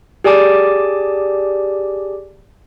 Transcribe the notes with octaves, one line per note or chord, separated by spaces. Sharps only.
G4 G#4 D5 G#5 A5 D6